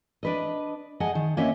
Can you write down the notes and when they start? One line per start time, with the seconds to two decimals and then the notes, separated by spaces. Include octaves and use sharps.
0.23 D4 B4 D#5
1.00 G#4 D#5 F#5 G#5 A5
1.15 D#3
1.37 A#3 C#4 C#5 D#5 E5